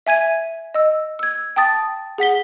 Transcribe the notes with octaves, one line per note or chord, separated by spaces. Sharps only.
E5 G#5 G#6 D#7
D#5 E6
E6 G#6
G5 A5 D#6 A6
G#4 F#5 B6 G7